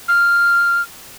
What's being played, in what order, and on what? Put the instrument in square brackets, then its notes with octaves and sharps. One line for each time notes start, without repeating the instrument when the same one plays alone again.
[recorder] F6